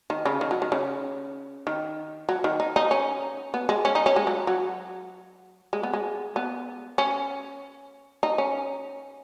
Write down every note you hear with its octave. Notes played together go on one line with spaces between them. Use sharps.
D#3
C#3
D#3
F#3
D#3
C#3
D#3
F#3
D#3
D#4
D#4
C#4
B3
G#3
C#4
D#4
C#4
G#3
F#3
F#3
G#3
B3
G#3
B3
C#4
D#4
C#4